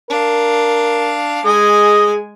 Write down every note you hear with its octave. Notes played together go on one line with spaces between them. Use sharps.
D4 A#4 F5
G#3 G#4 D#5 G#5